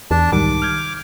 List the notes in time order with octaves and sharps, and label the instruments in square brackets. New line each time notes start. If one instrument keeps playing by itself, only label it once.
[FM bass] E2 [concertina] D4 A5
[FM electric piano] C2 G#2 D#3 [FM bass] G3 [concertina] D6
[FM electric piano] F6 G6 G#6